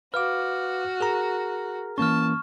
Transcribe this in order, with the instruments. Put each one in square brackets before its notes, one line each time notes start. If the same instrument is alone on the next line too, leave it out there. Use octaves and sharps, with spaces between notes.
[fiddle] F#4 [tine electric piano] B4 F5 D6 [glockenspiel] F6
[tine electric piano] G#4 A#4 A#5
[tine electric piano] E3 A#3 C#4 [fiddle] A5 [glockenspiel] C#6 F6